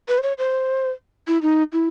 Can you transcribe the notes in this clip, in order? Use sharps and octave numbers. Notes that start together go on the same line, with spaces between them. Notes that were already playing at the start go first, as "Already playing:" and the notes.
B4
C5
C#5
C5
E4
D#4
E4